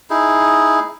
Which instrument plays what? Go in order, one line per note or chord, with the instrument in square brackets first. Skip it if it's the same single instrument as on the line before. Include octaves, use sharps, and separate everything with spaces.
[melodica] D#4 E4 G#4